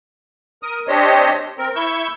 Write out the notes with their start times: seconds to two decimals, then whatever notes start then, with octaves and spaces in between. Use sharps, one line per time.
0.63 A#4 D#6
0.88 C4 D4 G4 C5 C#5 D#5
1.58 C4 A#4
1.76 E4 C#6 E6 G6